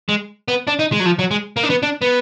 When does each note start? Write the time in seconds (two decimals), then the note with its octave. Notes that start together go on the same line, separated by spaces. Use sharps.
0.09 G#3
0.48 B3
0.67 D4
0.79 D#4
0.92 G#3
1.00 F#3
1.05 F3
1.19 F#3
1.31 G#3
1.57 A#3
1.64 D4
1.70 B3
1.83 D4
2.01 B3